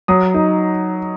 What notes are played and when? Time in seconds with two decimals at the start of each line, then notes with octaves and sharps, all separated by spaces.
0.08 F#3 D#6
0.34 D#4